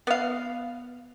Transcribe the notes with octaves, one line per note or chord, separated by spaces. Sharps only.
B3 F5